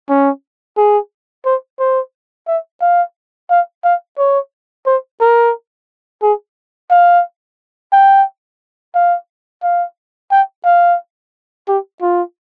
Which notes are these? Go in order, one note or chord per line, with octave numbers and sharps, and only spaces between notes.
C#4
G#4
C5
C5
E5
F5
F5
F5
C#5
C5
A#4
G#4
F5
G5
F5
F5
G5
F5
G4
F4